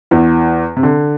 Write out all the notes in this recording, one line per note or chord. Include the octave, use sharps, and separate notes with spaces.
E2 E3
C3
D3